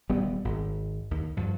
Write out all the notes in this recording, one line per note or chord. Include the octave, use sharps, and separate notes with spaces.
D#1 G3 B3
G#1
D#2
G2 D3 F3